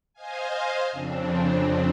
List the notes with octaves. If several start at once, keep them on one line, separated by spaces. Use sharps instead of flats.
C5 D#5 F5 G#5
F2 C#3 C4 D4